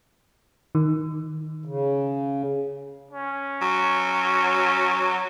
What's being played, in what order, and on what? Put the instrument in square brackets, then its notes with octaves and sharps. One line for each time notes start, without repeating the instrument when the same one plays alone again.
[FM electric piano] D#3
[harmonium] C#3
[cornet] C#4
[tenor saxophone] F#3